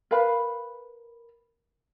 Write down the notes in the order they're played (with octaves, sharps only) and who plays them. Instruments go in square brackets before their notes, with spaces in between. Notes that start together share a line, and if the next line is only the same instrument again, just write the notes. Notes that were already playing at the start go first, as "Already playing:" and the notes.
[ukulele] A#4 B4 F5 B5